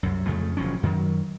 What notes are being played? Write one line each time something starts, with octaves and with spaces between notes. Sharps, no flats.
C2 F#2
F2 C#3 A3
F#1 A#2 F3 C#4
F#2 D#3 F#3